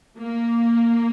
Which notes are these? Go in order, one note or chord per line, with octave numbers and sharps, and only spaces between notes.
A#3